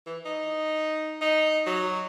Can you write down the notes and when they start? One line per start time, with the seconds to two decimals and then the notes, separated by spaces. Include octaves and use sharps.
0.06 E3
0.26 D#4
1.21 D#4
1.66 F#3